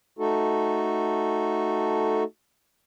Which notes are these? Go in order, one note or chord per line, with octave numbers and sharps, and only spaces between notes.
A3 D#4 F#4 A4